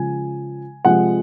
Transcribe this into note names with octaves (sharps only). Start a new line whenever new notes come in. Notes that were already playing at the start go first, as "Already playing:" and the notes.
Already playing: C#3 F3 G#3 G#5
C3 F3 G#3 F#5